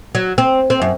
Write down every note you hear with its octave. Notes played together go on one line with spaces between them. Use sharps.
F#3
C4
C4
F#2